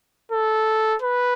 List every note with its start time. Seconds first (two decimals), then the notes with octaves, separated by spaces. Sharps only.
0.32 A4
1.02 B4